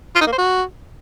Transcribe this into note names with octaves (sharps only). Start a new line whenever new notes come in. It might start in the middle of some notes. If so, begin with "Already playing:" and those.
F4
D#4
A#3
C5
F#4